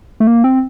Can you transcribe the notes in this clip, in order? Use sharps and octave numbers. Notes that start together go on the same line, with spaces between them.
A3
A#3
C4